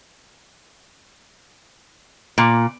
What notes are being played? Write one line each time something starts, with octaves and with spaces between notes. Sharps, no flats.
A#2